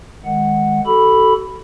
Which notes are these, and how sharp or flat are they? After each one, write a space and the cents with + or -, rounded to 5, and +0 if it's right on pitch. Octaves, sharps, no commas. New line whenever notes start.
D#3 +5 G#3 +0 F#5 +0
F#4 +40 A4 +0 B5 +0